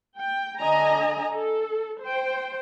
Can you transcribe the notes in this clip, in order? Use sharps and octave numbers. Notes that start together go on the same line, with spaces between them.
G5
D3 D#5 G#5 A#5
A4
C5 G5